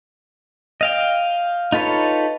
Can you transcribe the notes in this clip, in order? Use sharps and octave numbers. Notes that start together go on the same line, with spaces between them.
D#5 F5 G5
D#4 F4 A4 B4 C#5